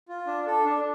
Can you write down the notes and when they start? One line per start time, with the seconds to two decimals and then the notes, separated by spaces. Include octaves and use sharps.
0.08 F4
0.27 D4
0.46 A4
0.65 D4